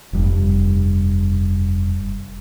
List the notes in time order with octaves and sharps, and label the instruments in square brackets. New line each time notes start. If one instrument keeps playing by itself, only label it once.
[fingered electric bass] F1 G2